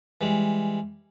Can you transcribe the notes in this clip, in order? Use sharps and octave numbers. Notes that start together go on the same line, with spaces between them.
E3 G3 G#3